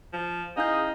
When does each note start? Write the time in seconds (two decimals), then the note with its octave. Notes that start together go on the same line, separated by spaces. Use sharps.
0.13 F3
0.57 C#4 D#4 E4 G#4 F5 G6